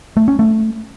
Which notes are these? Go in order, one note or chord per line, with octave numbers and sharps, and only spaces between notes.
A3
C#4
A3